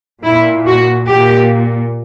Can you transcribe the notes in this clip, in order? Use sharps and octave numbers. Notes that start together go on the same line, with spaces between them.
A#2 E4
F#4
A#2 G4